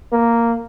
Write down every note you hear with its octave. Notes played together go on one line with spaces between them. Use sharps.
A#3